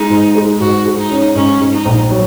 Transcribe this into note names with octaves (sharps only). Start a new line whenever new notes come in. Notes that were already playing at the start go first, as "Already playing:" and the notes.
Already playing: G#3 D#4
G#2
G#3
G#2 F#4
G#3
D#4
C#4
G#2 C#4
G#2
D#4
A#1
F#3